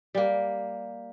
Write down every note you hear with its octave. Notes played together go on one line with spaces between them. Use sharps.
G3 A#3